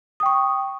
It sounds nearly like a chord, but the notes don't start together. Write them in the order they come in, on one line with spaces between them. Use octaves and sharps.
D#6 G5 C#6